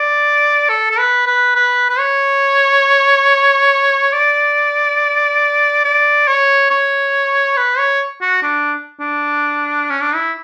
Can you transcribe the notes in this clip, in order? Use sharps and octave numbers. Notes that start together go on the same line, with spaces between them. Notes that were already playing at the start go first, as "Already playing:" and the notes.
Already playing: D5
A4
A4
B4
B4
B4
B4
C#5
D5
D5
C#5
C#5
B4
C#5
F#4
D4
D4
C#4
D4
E4